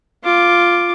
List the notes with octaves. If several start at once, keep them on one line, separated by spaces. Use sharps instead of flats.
F4 D6